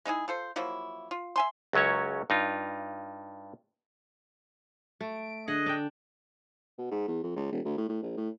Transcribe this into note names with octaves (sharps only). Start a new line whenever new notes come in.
G#3 D#4 E4 G#4
F4 A4 C5
F3 F#3 A#3 E4
F4
E5 G#5 C6
C#2 F#2 F#3 C#4 C#5
G2 D#4 F4
A3 D7
D3 G#4 D#5 F#5
D4 G5
B2
G#2
E2
F2
C#2
E1
D2
A2
A2
A#1
A2